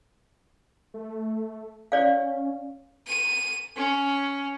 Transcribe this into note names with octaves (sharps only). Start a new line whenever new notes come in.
A3
C#4 C#5 D5 F5
D#7
C#4